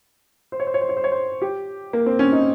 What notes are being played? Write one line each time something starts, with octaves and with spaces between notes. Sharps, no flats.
C5
C#5
C5
C#5
C5
C#5
C5
C#5
C5
G4
A#3
C4
C#4
D#4